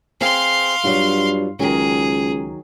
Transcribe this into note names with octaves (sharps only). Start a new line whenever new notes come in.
C4 G#4 F5 C6
G2 F#3 F4
C#2 D#3 F#3 G#4